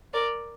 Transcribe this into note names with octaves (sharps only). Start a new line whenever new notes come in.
A#4 D5